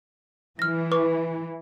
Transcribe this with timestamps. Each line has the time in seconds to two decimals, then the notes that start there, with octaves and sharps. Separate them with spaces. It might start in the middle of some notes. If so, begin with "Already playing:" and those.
0.59 E3 F6 A#6
0.91 B4 C#6 D6